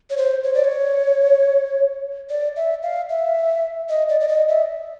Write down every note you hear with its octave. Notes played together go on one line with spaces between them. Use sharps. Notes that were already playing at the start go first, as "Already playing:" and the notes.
C#5
C5
C#5
D5
C#5
D5
E5
F5
E5
D#5
D5
D5
D#5
E5